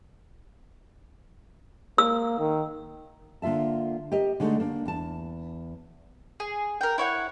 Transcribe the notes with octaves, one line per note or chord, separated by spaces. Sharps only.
A#3 E6
D#3
D3 A#3 F4 E5 A5
G4 A#4 D#5
D3 G#3 A3 D#4
A#3 D4
E2 A5
G#4
A#4 G5
E4 C#5 F#5